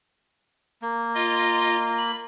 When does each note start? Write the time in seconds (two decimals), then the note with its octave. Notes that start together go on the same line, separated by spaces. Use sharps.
0.82 A#3
1.15 F4 D#5
1.97 B5